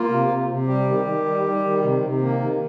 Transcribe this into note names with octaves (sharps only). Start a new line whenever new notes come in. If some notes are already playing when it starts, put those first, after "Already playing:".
Already playing: A#3 F4
C3
C3
C3
G3 G4
D#3
D#3
G3
G3
D#3
C3
C3
D#3 A#3
D#3